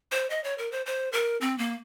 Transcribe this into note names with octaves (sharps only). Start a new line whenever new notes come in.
C5
D#5
C#5
A#4
C5
C5
A#4
C4
A#3